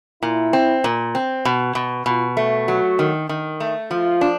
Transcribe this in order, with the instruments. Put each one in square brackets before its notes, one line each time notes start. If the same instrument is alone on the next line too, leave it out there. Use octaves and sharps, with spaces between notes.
[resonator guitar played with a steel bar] A#2 [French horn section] E4
[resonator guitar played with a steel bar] C4
A#2
C4
B2
B2
[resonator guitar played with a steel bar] B2 [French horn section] F4
[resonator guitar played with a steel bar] A3
[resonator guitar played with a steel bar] F#3 [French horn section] F#4
[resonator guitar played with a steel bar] D#3
D#3
A3
[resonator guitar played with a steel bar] F3 [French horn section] F4
[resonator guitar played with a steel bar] D4